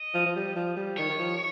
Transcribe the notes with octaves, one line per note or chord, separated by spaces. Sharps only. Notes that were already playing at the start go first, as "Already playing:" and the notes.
Already playing: D#5
F3
F3
G3
F3
G3
D#3 C#5
D#3
F3